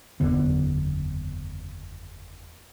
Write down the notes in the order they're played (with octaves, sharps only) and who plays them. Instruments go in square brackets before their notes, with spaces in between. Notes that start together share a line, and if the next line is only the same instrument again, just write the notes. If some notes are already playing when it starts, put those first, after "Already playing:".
[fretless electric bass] F#1 E2 D3 B3